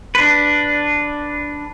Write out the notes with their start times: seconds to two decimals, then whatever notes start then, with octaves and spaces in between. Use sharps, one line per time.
0.15 D4 B4